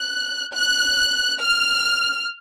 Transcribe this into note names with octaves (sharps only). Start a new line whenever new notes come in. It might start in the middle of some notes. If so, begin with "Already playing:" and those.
Already playing: F#6
F#6
F6